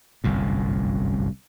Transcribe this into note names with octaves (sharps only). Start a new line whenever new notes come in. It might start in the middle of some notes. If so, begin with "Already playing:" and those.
G1 C2 F#2 A2